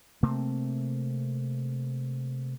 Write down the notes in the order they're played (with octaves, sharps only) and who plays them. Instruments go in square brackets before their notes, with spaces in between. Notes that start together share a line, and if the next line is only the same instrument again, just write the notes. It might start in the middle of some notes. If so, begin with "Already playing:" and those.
[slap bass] C3 A3 A#3 C4